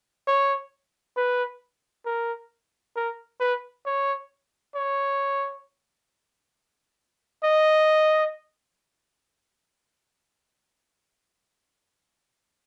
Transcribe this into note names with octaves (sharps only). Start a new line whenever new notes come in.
C#5
B4
A#4
A#4
B4
C#5
C#5
D#5